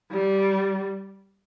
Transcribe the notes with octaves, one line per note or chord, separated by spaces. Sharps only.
G3